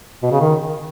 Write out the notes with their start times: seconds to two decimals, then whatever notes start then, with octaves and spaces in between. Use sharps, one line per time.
0.23 B2
0.32 C#3
0.40 D#3